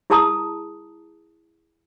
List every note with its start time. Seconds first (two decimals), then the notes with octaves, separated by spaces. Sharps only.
0.10 E4 G#4 A#4 A5 A#5 D#6